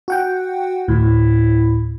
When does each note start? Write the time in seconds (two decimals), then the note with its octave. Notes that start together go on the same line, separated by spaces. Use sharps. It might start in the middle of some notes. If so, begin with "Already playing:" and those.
0.08 F#4 F#5 G5
0.88 D2 A2 E4